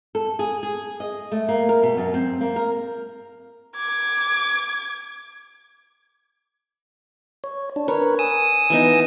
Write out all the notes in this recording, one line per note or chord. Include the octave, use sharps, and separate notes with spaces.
A4
G#4
G#4
D#5
A3
A#3
A#4
B2
F#2
C4
A#3
A#4
D6 G#6
C#5
D4
A#4 B4 C#5
G#5 D#6 E6
E3 B3 D#4